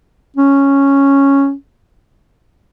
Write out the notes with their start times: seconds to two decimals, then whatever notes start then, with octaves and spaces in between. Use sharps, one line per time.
0.36 C#4